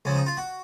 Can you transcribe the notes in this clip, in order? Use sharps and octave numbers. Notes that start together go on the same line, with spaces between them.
C#2 C#3 F3 C#4
D#4
F4
F#4